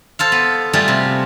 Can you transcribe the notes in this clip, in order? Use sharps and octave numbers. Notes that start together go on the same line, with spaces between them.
A4 C5 F5
B3
G3 A3 F4 G#4
C3